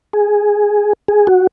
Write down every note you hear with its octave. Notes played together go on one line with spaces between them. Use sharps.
G#4
G#4
F#4